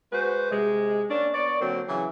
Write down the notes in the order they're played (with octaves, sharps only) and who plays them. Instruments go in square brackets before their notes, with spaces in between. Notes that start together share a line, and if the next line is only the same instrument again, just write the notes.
[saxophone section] G#3 F#4 B4 C5
C3 G#3
A#3 C#4 D4
B3 C#5 D5
D3 F#3 A#3 C4
C#3 E3 F#3